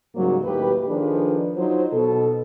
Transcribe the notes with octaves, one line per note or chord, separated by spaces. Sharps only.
G#2 C#3 F#3 G3 A#3
D#2 A2 G4 B4
D#3 F3 D4 G#4 A4 B4
F#3 D#4 F4 C5
B2 A4